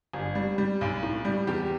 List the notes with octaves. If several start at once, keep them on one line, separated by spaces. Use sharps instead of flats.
G1
G3
G3
B1
A2
G3
E2 G4